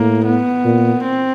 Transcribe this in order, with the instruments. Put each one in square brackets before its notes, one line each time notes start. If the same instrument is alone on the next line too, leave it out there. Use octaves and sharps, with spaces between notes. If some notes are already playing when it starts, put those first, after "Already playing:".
Already playing: [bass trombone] A2 [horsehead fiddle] A#3
[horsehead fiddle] B3
[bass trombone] A#2
[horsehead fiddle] C4